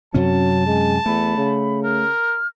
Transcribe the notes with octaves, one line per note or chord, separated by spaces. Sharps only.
F#2 C3 F#3 C#4 A5
G#3 G#5
E2 A3 B5
C#3
A#4 F6